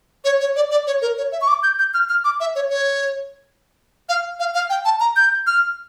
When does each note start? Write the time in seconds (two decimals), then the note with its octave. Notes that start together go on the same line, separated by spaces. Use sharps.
0.25 C#5
0.40 C#5
0.56 D5
0.71 D5
0.87 C#5
1.02 A#4
1.18 C#5
1.32 E5
1.41 C#6
1.48 D6
1.63 G6
1.79 G6
1.94 F6
2.09 F6
2.24 D6
2.40 E5
2.55 C#5
2.70 C#5
4.09 F5
4.40 F5
4.54 F5
4.70 G5
4.85 A5
5.00 A#5
5.16 G6
5.47 F6